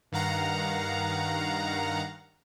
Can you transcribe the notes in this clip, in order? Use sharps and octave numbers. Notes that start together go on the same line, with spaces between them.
G2 D#3 F5 F#5 A#5